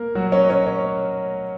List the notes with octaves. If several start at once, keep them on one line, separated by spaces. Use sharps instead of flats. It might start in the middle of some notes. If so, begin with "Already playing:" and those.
Already playing: A#3 A#4
F#3 F#4
C#4 C#5
D#5
C#4 C#5
C#4 C#5